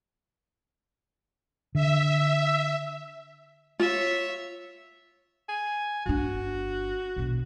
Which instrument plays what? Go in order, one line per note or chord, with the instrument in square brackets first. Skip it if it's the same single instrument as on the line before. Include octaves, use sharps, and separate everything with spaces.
[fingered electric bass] D3 [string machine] E5
[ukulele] F4 [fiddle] C#5 E5
[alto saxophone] G#5
[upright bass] G1 D4 [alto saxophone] F#4
[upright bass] A#1 B2